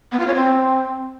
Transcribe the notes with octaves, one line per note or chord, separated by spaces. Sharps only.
B3
F4
C#5
C4